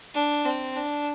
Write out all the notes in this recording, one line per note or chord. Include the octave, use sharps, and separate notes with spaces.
D4
C4
D4